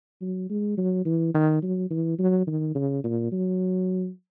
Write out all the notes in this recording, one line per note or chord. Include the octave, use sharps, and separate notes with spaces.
F#3
G#3
F#3
E3
D#3
F#3
E3
F#3
D#3
C#3
A#2
F#3